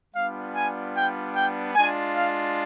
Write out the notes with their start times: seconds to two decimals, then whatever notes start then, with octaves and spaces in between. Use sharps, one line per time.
0.14 G3 B3 D4 F4 F5
0.54 G#5
0.94 G5
1.34 G5
1.74 G#3 D4 F4 G#5
2.15 F5